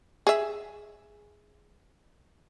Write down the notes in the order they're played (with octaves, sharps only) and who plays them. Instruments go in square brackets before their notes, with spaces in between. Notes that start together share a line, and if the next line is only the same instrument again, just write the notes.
[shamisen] G#4 E5